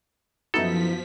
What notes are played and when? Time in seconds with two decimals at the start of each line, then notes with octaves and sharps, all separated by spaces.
0.54 F#2 F3 B3 D#4 E4 F#4 A4 B6